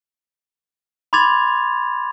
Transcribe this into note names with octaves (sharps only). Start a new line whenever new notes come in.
B5 C6 D6 G#6 A6 F7